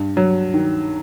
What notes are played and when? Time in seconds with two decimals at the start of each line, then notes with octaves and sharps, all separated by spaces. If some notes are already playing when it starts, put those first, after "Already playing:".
Already playing: G2
0.17 F#3
0.54 D#3